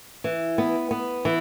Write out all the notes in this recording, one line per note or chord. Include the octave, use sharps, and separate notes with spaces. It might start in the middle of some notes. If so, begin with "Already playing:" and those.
E3
B3
B3
E3